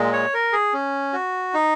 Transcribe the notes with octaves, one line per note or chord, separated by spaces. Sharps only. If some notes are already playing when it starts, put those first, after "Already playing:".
Already playing: A#2 G#3
C#5
A#4
G#4
C#4
F#4
D#4